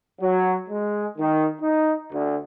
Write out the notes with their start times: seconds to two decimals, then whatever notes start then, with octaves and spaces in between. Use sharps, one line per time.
0.21 F#3
0.69 G#3
1.18 D#3
1.60 D#4
2.12 D2